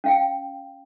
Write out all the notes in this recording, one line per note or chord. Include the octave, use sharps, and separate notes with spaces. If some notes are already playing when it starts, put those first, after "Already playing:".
C#4 F5 G5